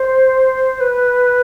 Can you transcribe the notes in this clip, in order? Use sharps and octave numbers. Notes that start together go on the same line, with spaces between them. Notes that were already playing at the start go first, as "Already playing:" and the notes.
Already playing: C5
B4